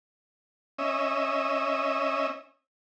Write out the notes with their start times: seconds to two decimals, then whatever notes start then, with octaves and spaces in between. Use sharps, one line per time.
0.78 C#4 D#5 E5